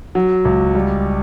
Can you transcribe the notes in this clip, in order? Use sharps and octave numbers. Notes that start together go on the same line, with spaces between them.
F#3
C#2
G3